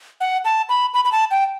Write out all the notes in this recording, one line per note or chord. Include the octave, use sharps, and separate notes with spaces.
F#5
A5
B5
B5
B5
A5
G5